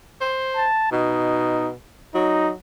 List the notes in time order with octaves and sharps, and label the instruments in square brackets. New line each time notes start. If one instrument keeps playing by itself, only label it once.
[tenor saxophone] C5
[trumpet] A5
[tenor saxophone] B2 [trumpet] D#4
[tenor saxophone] F#3 [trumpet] D#4